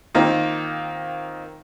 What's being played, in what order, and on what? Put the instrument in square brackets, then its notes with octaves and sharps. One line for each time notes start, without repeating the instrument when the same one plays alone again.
[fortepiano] D#3 A#3 C4 D#4 F4